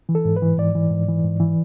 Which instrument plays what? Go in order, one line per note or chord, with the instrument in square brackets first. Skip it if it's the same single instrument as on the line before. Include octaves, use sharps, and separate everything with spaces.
[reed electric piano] E3
A4
G#2
B4
E3
G#2 D5
E3
G#2
E3
G#2
E3